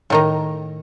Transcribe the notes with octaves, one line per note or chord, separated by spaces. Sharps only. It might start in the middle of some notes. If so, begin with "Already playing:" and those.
A2 D#3 A#5